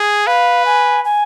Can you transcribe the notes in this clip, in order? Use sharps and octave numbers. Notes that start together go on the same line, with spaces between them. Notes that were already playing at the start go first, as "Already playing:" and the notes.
Already playing: G#4
B4 F5
G#5
G#5